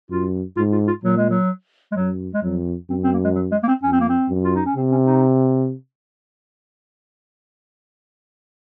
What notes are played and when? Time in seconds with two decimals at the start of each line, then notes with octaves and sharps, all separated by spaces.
0.10 F#2 F4
0.57 G#2 F4
0.72 F4
0.87 F4
1.04 A#2 F#3
1.17 G#3
1.30 F#3
1.92 G#3
1.96 F#2 F#3
2.34 G#3
2.43 F2 F#3
2.90 F#2 C4
3.03 C4
3.13 A#3
3.24 G#3
3.36 F#3
3.52 G#3
3.63 A#3
3.68 C4
3.83 F2 C#4
3.92 C4
4.01 A#3
4.09 C4
4.29 F#2
4.44 F4
4.55 D#4
4.66 C#4
4.76 C3 C4
4.92 C#4
5.06 D#4